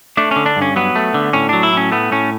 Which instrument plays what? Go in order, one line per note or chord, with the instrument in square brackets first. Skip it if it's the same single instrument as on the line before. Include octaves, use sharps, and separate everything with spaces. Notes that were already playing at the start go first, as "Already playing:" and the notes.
[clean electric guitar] A3 D4
D3 C#4
D4
G2
C#4
F#3 B3
A3
D3
A2 C#4
F#3 D4
E4
A2 C#4
A3 B3
A2 C#4